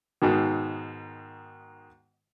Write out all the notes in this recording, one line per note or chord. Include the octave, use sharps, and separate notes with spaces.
G#2 B2 D#3